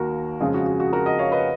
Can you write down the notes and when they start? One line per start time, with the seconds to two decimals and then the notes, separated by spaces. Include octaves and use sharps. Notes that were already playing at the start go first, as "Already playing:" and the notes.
Already playing: D#2 D#3 A#3 F#4 A#4
0.40 F2 C#3 G#3 F4 G#4
0.54 F#4
0.66 F#4
0.80 F#4
0.93 F#4 A#4
1.06 D#5 F#5
1.19 C#5 F5
1.32 B4 D#5